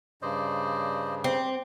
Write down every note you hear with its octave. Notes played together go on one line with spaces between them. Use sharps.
G2 C#3 C5 D5 D#5
C4 G4